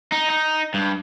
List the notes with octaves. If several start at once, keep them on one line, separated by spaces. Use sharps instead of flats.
D#4
D#4
G2